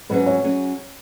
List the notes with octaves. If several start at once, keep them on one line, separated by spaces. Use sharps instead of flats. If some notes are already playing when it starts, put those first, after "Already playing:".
G#2 F#3 C#4 G#4 B4
C#5
F#3 C#4 G#4